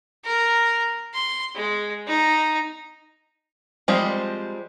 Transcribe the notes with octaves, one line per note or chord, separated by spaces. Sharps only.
A#4
C6
G#3
D#4
F3 G3 G#3 C4